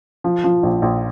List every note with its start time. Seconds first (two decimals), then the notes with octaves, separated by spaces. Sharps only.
0.24 F3
0.44 F3
0.63 A#1
0.82 A#1